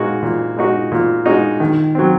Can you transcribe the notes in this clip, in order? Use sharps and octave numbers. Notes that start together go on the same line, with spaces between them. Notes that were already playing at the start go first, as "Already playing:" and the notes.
Already playing: A#2 G#3 D#4 F#4
A#2
G#3 D#4 F#4
A#2
G#3 D#4 F#4
D#3
F#3 C4